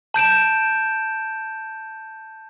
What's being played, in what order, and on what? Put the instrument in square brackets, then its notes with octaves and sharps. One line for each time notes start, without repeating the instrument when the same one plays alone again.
[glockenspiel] A5 G6 D7 E7